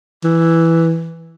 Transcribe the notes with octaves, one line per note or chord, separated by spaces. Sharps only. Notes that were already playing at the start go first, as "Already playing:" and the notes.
E3